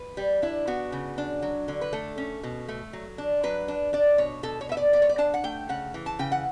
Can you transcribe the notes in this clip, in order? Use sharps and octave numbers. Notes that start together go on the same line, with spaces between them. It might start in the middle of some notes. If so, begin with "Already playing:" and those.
Already playing: B4
G3
D4 E4
B3 F#4
C#3
D4
F#3
D3
B4
A3 A4
C#4
B2
A3
F#3
D4
F#3 B4
D4
D4 D5
B2 C#5
B2 A4
C#5
B3 E5
D5
B3 D5
C#5
D5
D4 A5
F#5
A3 G5
C#3 F#5
E3
A5
C#3 G5
F#5